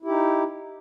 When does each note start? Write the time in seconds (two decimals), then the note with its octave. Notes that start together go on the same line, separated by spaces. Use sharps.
0.02 E4
0.05 G4
0.08 D#4